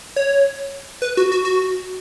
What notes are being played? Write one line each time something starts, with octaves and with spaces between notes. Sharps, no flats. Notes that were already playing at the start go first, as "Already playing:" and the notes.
C#5
B4
F#4
F#4
F#4